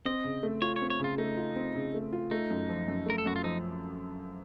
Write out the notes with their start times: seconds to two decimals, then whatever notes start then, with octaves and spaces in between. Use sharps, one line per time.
0.05 C4 D#5
0.24 C#3
0.43 A3
0.62 F4 C#5
0.76 C#5
0.82 C4
0.90 C#5
1.00 C#3 F4
1.18 A3 D#4
1.37 F4
1.56 C4
1.75 C#3
1.94 A3
2.13 F4
2.31 A3 D#4
2.51 F#2
2.69 F3
2.88 F#2
3.06 A3 A#4
3.18 A4
3.26 F#2 F#4
3.36 F4
3.43 F3 D#4